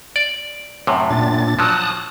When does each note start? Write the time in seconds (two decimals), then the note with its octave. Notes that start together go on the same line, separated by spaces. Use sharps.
0.16 D5
0.87 F#2 A2 C3
1.10 A#2 D4 A6
1.59 F3 F#3 A5 D#6 F#6